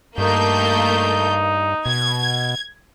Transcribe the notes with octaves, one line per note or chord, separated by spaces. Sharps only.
G2 A3 A#3 D#4 G6
B2 G#6